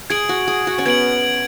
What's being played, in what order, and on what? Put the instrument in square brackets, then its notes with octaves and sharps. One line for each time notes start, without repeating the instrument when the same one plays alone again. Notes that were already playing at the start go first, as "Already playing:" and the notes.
[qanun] G#4 [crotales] G#6 D7 F#7
[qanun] F#4
G#4
F#4
C#4
[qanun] B3 [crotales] G#6 D7 F#7